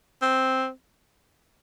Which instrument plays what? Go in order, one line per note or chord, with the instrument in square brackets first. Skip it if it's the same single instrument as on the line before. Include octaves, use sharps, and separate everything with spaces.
[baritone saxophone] C4